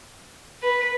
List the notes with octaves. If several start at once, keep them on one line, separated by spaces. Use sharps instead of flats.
B4